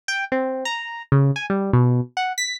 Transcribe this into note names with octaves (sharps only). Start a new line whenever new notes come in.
G5
C4
A#5
C#3
G#5
G3
B2
F#5
B6